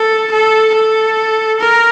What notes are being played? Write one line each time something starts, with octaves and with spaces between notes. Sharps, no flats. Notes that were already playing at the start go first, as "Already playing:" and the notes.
Already playing: A4
A4
A4
A#4